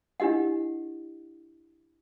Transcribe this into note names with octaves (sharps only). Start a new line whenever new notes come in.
D4 E4 G4 D#5 F#5